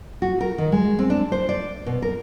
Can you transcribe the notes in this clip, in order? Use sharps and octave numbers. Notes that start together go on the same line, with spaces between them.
F#4
A#4
D#3
G#3
C4
D4
C5
D5
B2
A#4